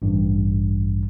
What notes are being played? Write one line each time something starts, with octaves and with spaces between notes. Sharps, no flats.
A1 G2